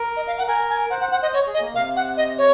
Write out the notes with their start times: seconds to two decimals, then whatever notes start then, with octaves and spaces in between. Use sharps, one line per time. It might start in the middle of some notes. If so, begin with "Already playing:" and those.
Already playing: A#4
0.16 D#5
0.27 F5
0.38 F#5
0.48 A#4 G#5
0.70 G#5
0.90 C5 F#5
1.01 C5 F#5
1.12 C5 F#5
1.22 C5 D#5
1.33 C#5
1.47 G#4
1.54 D#5
1.61 A#3
1.75 C3 F5
1.96 F#5
2.17 D#5
2.38 C#5